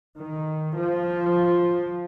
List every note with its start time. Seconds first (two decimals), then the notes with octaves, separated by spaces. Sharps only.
0.18 D#3
0.78 F3